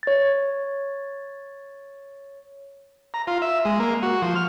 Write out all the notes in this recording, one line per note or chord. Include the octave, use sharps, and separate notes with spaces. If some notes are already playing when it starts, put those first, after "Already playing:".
C#5 A6
A#5
F4
E5
G#3
A#3
F#4
F3
F6